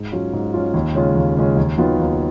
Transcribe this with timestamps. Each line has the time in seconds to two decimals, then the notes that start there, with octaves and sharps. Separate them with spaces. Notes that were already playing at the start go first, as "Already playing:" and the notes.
Already playing: G#2
0.12 F#3 C#4 F4
0.33 G#2
0.53 F#3 C#4 F4
0.74 D#2
0.95 C#3 G#3 C#4 F4
1.15 D#2
1.36 C#3 G#3 C#4 F4
1.57 D#2
1.78 D#3 F#3 B3 F4
1.99 D#2